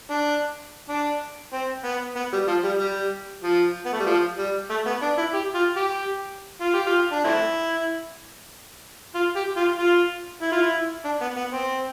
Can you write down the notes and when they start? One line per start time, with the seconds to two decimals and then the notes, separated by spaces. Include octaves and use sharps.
0.10 D4
0.89 D4
1.53 C4
1.85 B3
2.16 B3
2.33 G3
2.48 F3
2.64 G3
2.80 G3
3.44 F3
3.86 B3
3.93 A3
4.00 G3
4.06 F3
4.38 G3
4.70 A3
4.86 B3
5.02 D4
5.18 E4
5.34 G4
5.55 F4
5.76 G4
6.61 F4
6.74 G4
6.86 F4
7.12 D4
7.25 A3 C4 E4
9.15 F4
9.36 G4
9.57 F4
9.78 F4
10.42 E4
10.52 F4
10.62 E4
11.05 D4
11.21 B3
11.37 B3
11.53 C4